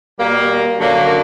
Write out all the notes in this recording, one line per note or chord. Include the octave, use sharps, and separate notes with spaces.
B2 G3 A#3
F#2 D3 F#3 A#3